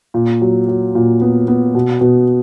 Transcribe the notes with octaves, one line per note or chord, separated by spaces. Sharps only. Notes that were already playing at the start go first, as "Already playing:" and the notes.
A#2
F#3
F#3
A#2
B3
B3
B2
B2